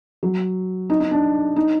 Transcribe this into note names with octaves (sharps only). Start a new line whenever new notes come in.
F#3
D#4
D#4
D4
D#4